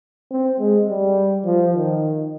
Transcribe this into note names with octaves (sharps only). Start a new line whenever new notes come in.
C4
G#3
G3
F3
D#3